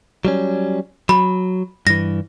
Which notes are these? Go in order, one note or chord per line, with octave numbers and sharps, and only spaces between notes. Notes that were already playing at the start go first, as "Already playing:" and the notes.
F#3 G3 C#4
F#3 B5
G2 E3 A#6